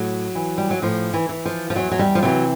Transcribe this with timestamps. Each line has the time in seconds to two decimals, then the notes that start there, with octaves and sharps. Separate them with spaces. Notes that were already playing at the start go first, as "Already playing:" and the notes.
Already playing: A2 F#3
0.35 E3
0.58 G3
0.70 F#3
0.82 A2 F3
1.14 E3
1.29 E3
1.46 F3
1.70 F3
1.75 E2 F#3
1.92 F#3
1.99 G3
2.15 F3
2.23 C3 E3 F#3